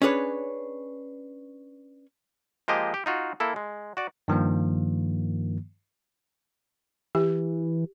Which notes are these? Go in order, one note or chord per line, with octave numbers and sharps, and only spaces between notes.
C#4 D4 G#4 B4 C#5
F3 G#3 A#3 G4 D#5
G4
D#4 F4 F#4
A#3 E4 A4
G#3
F#4 D5
G2 D#3 F3 A#3
E3 G4